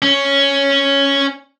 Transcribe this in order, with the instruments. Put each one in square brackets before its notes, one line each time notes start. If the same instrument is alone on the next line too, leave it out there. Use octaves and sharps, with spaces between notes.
[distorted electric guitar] C#4